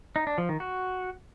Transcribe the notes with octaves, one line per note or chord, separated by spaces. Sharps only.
D#4
D4
F3
D#3
F#4